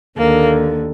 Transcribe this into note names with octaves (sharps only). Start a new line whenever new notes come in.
D#2 D3 A#3